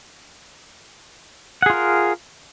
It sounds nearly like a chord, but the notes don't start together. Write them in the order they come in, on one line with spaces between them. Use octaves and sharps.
F#5 G#4 F4 A#4